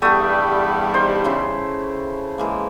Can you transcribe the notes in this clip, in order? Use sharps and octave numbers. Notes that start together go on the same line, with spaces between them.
E2 G2 G3 A3 B3 E5 G5 D#6
D#4 C5
C#3 E4 C6
E3 G#3 A#3